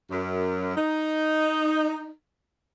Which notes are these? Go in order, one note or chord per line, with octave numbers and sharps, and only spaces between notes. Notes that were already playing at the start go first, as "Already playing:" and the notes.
F#2
D#4